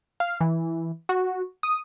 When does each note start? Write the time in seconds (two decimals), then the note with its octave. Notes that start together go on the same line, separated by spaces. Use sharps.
0.20 F5
0.41 E3
1.09 F#4
1.63 D#6